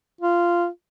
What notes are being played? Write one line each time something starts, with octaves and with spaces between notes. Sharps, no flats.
F4